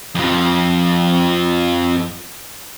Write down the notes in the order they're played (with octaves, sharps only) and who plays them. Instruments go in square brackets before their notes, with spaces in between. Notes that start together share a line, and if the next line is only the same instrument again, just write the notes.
[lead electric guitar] F2 F3